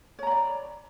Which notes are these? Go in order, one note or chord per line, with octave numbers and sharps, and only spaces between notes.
C#5 D5 A#5 B5